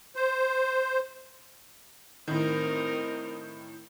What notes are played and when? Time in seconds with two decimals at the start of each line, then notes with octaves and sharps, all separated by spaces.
0.16 C5
2.28 A2 D#3 C4 D#4 A#4